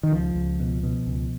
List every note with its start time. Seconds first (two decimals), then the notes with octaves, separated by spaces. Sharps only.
0.03 D#3
0.11 C#2 F3
0.35 C#2
0.60 B2
0.83 B2
1.07 C#2